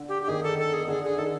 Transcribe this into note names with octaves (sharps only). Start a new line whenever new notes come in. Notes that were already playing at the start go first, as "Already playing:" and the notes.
Already playing: D3
G4
G4
D#3 D#4 G#4
A4
A4
G#4
D3 D4 G#4
G#4
D#3 D#4 A4